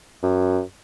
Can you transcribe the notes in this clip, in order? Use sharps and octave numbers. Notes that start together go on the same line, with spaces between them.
F#2